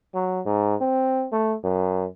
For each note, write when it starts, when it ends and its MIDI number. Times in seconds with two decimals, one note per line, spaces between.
0.15 0.41 54
0.46 0.75 44
0.81 1.27 60
1.33 1.55 57
1.64 2.06 42